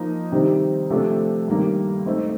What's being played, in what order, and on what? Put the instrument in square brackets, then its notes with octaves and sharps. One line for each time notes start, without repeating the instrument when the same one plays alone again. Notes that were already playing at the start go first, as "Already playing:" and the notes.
Already playing: [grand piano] F3 A#3 D#4
C3 D#3 G3 C4
C3 F3 A3 D4 A4
G2 D#3 G3 A#3
A3 C4 D#4